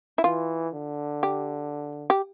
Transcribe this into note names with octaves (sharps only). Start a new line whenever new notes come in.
E4
E3 F4
D3
G4
G4